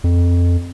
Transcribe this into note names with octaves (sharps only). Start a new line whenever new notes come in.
F2